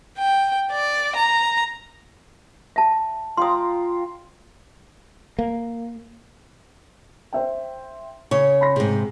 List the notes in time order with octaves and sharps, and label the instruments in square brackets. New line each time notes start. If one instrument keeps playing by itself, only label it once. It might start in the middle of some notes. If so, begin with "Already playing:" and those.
[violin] G5
D5
A#5
[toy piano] E5 A5
[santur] F4 G5 A#5 [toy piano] C6 D#6
[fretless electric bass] A#3
[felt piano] C5 E5 G5
[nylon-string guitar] C#3 C#5 [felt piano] C#6
[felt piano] B5 C6 A#6
[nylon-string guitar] G#2 C3 [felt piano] G#4